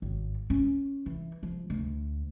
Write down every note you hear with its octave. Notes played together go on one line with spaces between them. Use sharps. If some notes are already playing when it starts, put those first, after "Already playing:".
G#1
C#4
E3
F3
D2